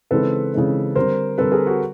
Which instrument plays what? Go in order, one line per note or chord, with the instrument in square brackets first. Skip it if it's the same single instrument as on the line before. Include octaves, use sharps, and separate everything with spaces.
[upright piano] C#3 E3 G#3 C4 D#4 [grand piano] A4 B4
[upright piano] C#3 E3 G#3 C4 D#4
[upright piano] D3 G3 C4 [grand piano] A#4 C5
[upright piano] D3 G3 C4 [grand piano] A4 B4
[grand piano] G#4 A#4
F#4 G#4